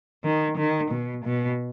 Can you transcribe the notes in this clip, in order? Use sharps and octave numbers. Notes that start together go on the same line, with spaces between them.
D#3
D#3
B2
B2